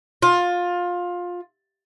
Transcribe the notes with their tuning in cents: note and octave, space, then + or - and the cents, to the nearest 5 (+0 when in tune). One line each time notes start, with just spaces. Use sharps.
F4 +20